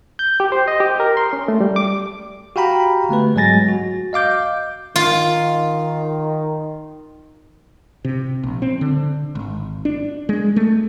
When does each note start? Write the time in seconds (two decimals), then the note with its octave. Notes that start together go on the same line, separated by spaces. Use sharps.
0.19 G6
0.40 G4
0.52 C5
0.68 D#5
0.80 G4
1.00 A#4
1.17 C6
1.33 C#4
1.48 A3
1.61 G3
1.76 D6
2.56 F#4 G4 F5 G5 A#5 B5
3.09 D3 A3 B3 B4
3.35 G#2 F#3 G#3 G#5 A6 A#6
3.68 F#4
4.13 D#5 F5 D6 G6
4.96 D#3 F4
8.05 C3
8.43 A#1
8.62 C4
8.81 D3
9.35 G#1
9.85 D4
10.29 G#3
10.56 A3